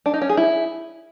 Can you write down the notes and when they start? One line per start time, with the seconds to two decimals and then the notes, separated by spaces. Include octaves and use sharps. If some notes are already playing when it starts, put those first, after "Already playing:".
0.06 D4
0.14 D#4
0.22 C#4
0.29 G#4
0.37 E4